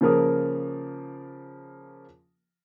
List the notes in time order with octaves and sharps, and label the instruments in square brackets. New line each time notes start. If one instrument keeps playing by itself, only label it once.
[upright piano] C#3 F3 A#3 A#4 D#6